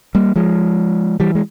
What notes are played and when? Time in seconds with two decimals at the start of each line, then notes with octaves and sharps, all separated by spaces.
0.15 G3 A#3
0.36 F3 G#3
1.20 E3 G3
1.35 G#3